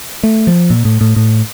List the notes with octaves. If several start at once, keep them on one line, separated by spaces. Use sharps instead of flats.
A3
F3
A#2
A2
A2
A2